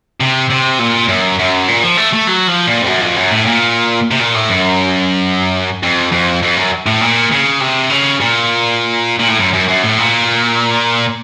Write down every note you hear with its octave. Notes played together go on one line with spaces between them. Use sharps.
C3
C3
A#2
F#2
F#2
A#2
F3
A3
A3
F#3
F3
A#2
F2
F#2
F2
F#2
A2
A#2
C3
A#2
A2
F#2
F2
F2
F2
F#2
A2
A#2
C#3
C3
C#3
A#2
A#2
A2
F#2
F#2
F#2
A2
A#2